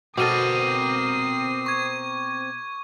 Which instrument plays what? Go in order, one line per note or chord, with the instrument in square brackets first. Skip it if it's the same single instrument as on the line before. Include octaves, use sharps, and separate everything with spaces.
[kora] B2 A4 [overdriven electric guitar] C4 A#4 [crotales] D6 D#7 [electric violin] D#6 C7
[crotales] C#6 G#6